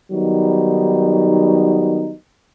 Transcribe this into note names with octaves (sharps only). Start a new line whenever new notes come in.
D#3 F#3 G3 B3 D#4